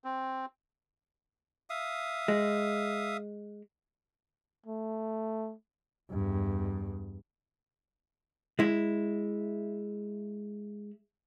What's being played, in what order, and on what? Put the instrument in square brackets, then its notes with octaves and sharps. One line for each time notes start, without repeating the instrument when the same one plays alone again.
[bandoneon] C4
[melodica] E5 F5 D#6
[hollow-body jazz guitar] G#3
[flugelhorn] A3
[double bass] E2 G2
[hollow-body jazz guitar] G#3 E4